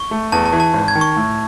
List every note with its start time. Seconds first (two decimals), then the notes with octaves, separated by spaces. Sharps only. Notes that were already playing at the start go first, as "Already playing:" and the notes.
Already playing: C#6
0.11 A3
0.32 E2 A5
0.46 A5
0.53 E3
0.60 A5
0.73 G#1
0.88 G#6
0.95 D#3
1.01 C#6
1.16 A2